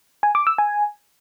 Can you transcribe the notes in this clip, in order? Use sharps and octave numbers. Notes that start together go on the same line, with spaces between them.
G#5
D6
E6
G#5